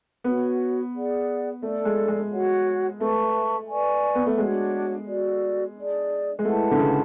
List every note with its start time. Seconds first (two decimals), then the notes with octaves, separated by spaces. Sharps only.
0.24 B3 F#4 C#5 F#5
0.94 G#4 D5 F#5
1.62 A3 D4 A4 D5
1.85 G#3
2.08 G#3
2.32 F#4 C#5 F#5
3.00 A3 B4 E5 A5 C#6
3.68 B4 D5 G#5 C#6
4.15 B3
4.26 A3
4.38 G#3 D4 F#4 C#5 F#5
5.07 F#4 A4 D5
5.76 D4 G#4 D5
6.39 G#3
6.44 A3 E4 B4 F#5 A5
6.71 D3
6.79 C#3